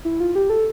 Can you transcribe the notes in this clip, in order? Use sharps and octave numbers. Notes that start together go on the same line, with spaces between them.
E4
F4
G4
A4